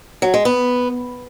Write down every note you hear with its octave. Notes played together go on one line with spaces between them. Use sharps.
F#3
G#3
B3